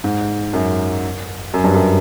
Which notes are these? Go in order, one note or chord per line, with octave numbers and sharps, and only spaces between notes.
G#2
F#2
F#2
G2
F#2